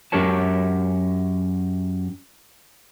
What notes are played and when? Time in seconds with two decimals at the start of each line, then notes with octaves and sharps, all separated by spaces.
0.12 F#2 G4 A#4 C#5 A5